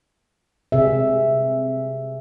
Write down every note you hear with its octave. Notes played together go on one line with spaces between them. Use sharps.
C3 G#4 E5